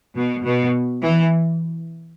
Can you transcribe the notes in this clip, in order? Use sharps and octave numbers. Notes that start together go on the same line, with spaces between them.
B2
B2
E3